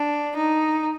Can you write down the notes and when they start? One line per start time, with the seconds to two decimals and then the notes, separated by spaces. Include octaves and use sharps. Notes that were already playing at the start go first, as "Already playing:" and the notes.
Already playing: D4
0.36 D#4